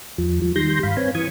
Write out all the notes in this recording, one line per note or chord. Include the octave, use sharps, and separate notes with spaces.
E2 F3
F3
D#3 G3 C6 G6 A#6
G2 F5 B5
C4 B4 C#5 G#5
E3 C#6 D#6 G#6